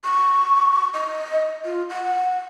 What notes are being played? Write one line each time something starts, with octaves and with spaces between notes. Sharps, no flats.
C#6
D#5
F4
F#5